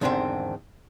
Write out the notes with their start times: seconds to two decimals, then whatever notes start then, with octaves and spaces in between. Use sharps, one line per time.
0.01 E2 G#2 D3 D#3 G3 C4